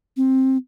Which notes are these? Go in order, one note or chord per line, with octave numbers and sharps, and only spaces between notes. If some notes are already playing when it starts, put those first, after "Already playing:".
C4